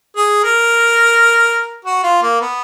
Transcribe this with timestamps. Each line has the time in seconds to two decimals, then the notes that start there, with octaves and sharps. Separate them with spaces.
0.16 G#4
0.44 A#4
1.85 F#4
2.03 F4
2.22 A#3
2.41 B3